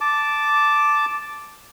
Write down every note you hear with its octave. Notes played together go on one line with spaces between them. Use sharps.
A5 D6